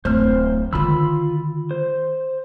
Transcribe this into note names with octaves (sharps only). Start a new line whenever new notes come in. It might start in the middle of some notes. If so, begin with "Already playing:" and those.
D1 F#2 C5 F6
D3 D#3 F4 B5 E6
C5